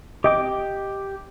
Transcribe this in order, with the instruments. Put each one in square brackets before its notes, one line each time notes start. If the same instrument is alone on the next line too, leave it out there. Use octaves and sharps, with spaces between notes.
[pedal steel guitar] G4 G5 D6 [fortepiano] D#5